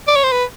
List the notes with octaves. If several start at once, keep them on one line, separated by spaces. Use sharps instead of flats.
D5
C#5
C5
B4